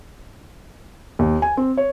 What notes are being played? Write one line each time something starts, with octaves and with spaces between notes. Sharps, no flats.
D#2
G#5
C4
C#5